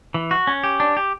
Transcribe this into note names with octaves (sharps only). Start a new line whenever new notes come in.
E3
F#4
C#4
G4
D4
G4